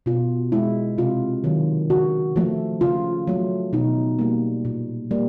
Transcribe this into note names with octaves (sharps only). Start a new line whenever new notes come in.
B2 F4
G#3 E4
C3 F4
D#3 F#3
C#3 F#4
F3 A3
C#3 F4
F#3 A3
B2 D#4
G3 A#3
A#2
G3 A#3